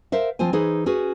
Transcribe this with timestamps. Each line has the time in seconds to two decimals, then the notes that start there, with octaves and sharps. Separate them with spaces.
0.12 A#4 C5 E5 F5
0.39 F3 C4 F4 C5 G#5
0.53 E3 D#4 G#4 C5
0.86 C#4 F#4 G#4 B4